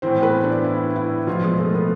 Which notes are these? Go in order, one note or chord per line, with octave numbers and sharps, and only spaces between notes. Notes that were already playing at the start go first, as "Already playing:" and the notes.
A2 E3 C4 C5
B3 B4
D4
E4
E4
B2 F3 F4
G#3 G#4
A3 A4
B3 B4